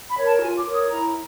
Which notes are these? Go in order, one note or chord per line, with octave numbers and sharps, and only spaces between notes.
B5
A#4 C#5
A5
F4 G#5
D6
A#4 C#5
D#6
E4 A#5